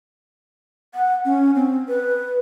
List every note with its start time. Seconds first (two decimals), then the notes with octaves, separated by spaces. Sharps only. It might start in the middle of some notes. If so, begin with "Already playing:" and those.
0.94 F#5
1.25 C#4
1.55 C4
1.88 B4